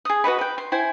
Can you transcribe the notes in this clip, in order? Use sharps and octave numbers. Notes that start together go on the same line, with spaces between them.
G#4 D#6
F#4 B4 D#5 B5
B4 G5
C6
E4 C5 G5 G#5